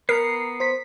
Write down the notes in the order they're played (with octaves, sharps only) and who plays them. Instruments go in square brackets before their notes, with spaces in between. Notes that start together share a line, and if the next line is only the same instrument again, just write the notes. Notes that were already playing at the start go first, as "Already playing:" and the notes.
[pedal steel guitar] B3 A#5 [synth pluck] A#4 [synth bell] C7
[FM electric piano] C5 B6